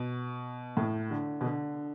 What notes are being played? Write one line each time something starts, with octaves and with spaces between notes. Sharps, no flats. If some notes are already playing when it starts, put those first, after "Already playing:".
Already playing: B2
A2
D3
B2
D3